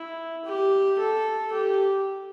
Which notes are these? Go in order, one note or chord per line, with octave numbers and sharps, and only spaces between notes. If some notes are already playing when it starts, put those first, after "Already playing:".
Already playing: E4
G4
A4
G4